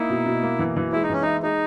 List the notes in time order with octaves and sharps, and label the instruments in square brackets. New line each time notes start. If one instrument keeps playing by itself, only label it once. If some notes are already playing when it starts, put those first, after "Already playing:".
Already playing: [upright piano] A#3 D#4 [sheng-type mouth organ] E4
[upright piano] B2
B2
A#3
E3
E3
[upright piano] G#3 [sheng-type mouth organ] E4
[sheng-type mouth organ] D#4
[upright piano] E3 [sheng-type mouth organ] C#4
[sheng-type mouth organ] D#4 [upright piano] E4
[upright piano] G#3 [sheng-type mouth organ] D#4